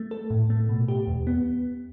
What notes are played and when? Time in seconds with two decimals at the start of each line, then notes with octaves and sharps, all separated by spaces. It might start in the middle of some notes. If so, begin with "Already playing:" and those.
Already playing: A3
0.11 A4
0.30 A2
0.50 A3
0.69 B2
0.88 G4
1.07 E2
1.27 B3